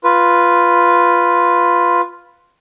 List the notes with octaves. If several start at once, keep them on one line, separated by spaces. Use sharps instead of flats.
F4 B4